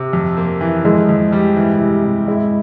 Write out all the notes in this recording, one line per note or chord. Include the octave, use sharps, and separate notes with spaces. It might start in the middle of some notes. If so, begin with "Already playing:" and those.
Already playing: C3
F2
A#3
E3
F2 G#3
F2
G3
E3
C3
C3
G#3 E4